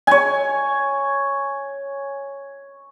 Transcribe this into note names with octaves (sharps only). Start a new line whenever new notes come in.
C#5 G#5